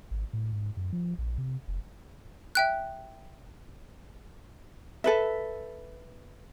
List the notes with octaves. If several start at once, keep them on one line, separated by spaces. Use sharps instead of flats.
G#1
A2
G#2
F#2
F3
A#1
C3
F1
E5 G5 F#6
A4 B4 E5